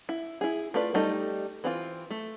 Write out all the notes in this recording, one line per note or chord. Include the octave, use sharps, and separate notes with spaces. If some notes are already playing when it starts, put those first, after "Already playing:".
E4
E4 G#4
A3 F4 B4 D5
G3 A3 D#4
E3 C4 F4
A3